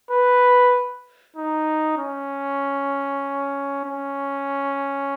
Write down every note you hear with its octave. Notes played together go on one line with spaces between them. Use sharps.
B4
D#4
C#4
C#4